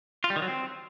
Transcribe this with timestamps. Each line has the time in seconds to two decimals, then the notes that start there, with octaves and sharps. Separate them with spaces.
0.24 F4
0.30 G3
0.36 D#3
0.42 F#3
0.48 C4